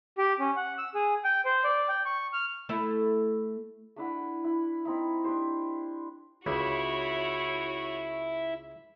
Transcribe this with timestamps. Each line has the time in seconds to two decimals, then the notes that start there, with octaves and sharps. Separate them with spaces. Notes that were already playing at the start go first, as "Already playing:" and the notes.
0.18 G4
0.39 C#4
0.56 F#5
0.78 E6
0.95 G#4
1.24 G5
1.45 C5
1.64 D5
1.89 G5
2.05 C#6
2.33 F6
2.69 A3 E4
3.96 A3 D4 E4 F#5
4.44 E4
4.85 C4 D#4 E4
5.24 D4 G4 C5
6.47 C#2 E4 F#4 C#5